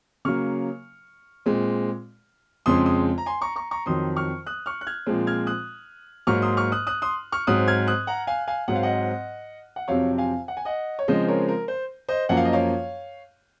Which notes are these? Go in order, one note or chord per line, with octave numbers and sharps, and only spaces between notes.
C#3 F#3 A#3 C#6 F6
A#2 G#3 C4
F2 C#3 G#3 C4 C6 D#6
C6 D#6
A#5
G#5 C6
A#5 C#6
A#5 C#6
A#5 C#6
F2 D#3 F#3 C6 D#6
C#6 F6
D#6 F#6
C#6 F6
F#6
F6 G#6
A#2 F3 G#3 C4
F6 G#6
D#6 F#6
G#2 F#3 A#3 C#6 F6
C6 D#6
C#6 F6
D#6 F#6
D#6 F#6
C6 D#6
C#6 F6
G#2 F#3 C4 D#6 F#6
F6 G#6
D#6 F#6
F#5 A#5
F5 G#5
F5 G#5
G#2 F#3 C4 F#5
F5
D#5 F#5
F#5
F2 C3 F#3 C4 C#5 F5
F5 G#5
F#5
G#5
D#5 F#5
C#5
C#3 F3 G#3 C4 C5 D#5
A#4 C#5
A#4
C5
C5 D#5
F#2 F3 A#3 F#5
F5
D#5
C#5 F5